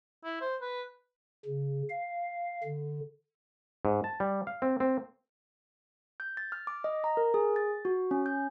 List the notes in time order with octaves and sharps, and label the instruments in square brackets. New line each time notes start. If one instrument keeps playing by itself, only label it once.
[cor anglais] E4
C5
B4
[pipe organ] C#3
F5
D3
[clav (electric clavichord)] G#2
A5
G3
F5
C4
C4
[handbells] G6
A6
F6
D6
D#5
A#5
A#4
G#4
A6
F#4
C#4
G6